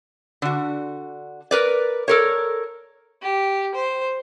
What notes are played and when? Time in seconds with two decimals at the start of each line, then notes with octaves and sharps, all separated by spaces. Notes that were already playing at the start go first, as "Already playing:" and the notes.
0.42 D3 F#4
1.51 A#4 B4 D5
2.08 A4 A#4 C#5
3.22 G4
3.75 C5